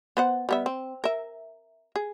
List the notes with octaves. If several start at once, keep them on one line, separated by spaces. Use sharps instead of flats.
B3 C5 F#5
G3 B3 E5
C4
A#4 E5
G#4